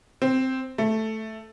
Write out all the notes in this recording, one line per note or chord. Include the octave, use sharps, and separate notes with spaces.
C4
A3